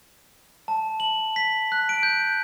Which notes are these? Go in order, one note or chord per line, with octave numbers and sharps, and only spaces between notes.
A5
F#7
B6
F#6
D7
G6